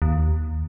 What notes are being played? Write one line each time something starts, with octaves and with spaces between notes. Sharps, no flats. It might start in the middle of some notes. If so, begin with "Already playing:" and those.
D#2